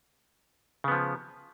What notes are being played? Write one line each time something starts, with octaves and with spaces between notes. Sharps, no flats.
C#3 F3 B3